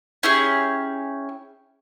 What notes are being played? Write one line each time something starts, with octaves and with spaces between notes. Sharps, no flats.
C#4 E4 G4 G#4